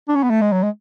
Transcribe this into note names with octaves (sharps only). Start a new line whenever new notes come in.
D4
C#4
B3
A3
G#3
F#3
G#3